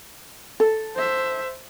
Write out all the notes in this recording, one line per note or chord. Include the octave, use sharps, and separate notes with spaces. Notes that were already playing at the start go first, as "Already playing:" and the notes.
A4
C5 E5